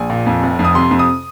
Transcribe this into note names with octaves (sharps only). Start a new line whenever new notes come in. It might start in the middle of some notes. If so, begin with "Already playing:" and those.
Already playing: A#1 G#5
A#2
F2
F1
F2
D#6
C3 C6
F2
D#6